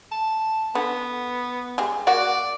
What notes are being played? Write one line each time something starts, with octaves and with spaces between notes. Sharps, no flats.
A5
D3 B3
G3 G#3
A#3 F#4 D5 F#5